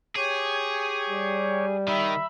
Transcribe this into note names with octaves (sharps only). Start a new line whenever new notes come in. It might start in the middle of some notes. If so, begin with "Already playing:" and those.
G4 G#4 C#5
G3
D#3 E5 B5